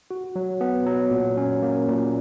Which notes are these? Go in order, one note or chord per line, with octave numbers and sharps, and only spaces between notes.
F#4
F#3
B3
F#3
A#2
C#4
A#3
A#2